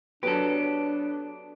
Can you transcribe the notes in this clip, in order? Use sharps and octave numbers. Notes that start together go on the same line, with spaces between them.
F#3 B3 D4 G4 A4 B4